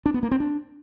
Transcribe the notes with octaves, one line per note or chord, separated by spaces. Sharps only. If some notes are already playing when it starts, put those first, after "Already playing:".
D4
B3
A#3
C4
D4